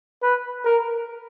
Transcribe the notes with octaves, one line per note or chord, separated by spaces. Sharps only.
B4
A#4